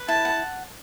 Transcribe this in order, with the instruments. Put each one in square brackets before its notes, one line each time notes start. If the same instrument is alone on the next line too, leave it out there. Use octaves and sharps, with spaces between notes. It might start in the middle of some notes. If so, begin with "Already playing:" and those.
Already playing: [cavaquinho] B4
[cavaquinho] E4 [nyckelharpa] A5
[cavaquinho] F#5